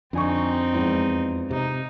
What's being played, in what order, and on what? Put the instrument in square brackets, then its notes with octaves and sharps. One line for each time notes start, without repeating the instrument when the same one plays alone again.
[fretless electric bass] F2 [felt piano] D3 G#5 C#6 [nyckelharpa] C4 D#4
[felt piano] E2 G#2 F3
[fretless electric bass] C3 [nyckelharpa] D#4